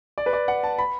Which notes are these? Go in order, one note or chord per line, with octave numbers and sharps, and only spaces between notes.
D5
B4
D5
F#5
A5
B5